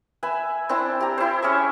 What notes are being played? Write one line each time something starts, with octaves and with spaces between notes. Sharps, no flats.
B4 E5 G#5
C4 D4 E4
G4 A#5
E4 C5
C#4 G#4 E5